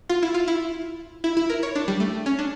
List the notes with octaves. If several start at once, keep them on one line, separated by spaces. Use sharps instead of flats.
F4
E4
F4
E4
E4
E4
A#4
C#5
D4
G3
A3
C#4
D4